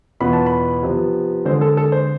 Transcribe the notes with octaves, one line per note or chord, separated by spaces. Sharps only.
E2 B2 B3 F4 B5
A5
B5
C3 F3 B3
D3 G#3 C4 C5
A4
A4
C5